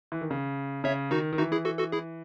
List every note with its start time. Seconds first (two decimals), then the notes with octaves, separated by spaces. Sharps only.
0.12 E3
0.21 D#3
0.31 C#3
0.84 C#3 C#5 E5
1.11 D#3 D#4 F#4
1.33 D#3
1.38 E3 D#4 F#4
1.52 E4 G#4
1.65 F#4 A4
1.78 F#4 A4
1.92 E4 G#4